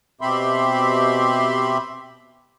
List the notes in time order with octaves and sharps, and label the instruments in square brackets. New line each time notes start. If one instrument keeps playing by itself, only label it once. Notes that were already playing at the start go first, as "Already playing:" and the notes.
[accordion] B2 C4 G4 E5 B5 C6